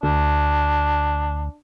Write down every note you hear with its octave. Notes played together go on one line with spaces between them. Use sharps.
D2 D4